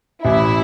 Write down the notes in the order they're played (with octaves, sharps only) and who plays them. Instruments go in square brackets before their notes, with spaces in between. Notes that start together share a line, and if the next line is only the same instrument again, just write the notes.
[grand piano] A1 [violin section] E4